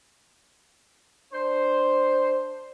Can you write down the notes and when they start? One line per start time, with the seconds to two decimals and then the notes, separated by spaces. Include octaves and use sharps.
1.32 D4 C5